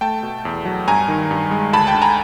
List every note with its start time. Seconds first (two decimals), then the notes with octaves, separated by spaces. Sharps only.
0.01 A3 G5 A5
0.23 B2
0.45 E2
0.65 F#3
0.88 G2 G#5 A#5
1.08 D#3
1.31 G2
1.51 G#3
1.73 D2 A5 B5
1.87 G5 A5
1.95 D3
2.02 G#5 A#5